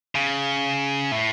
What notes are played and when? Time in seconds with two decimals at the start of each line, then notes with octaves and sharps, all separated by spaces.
0.15 C#3
1.12 A2